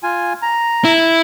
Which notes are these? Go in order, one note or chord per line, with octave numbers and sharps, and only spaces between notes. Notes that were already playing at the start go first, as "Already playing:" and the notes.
F4 G#5
A#5
E4